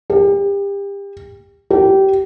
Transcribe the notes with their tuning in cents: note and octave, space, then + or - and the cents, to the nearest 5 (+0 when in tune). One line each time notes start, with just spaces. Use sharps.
G4 +30
G4 -20